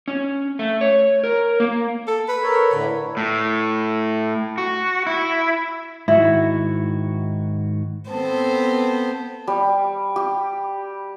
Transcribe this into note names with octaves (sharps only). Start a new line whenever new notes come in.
C#4
A3
C#5
A#4
A#3
A4
B4
A4 A#4 C#5
A2 D3 B4
A2
F#4
E4
G#2 D#3 E4 F#4
B3 C4 A4 C5
G3
G4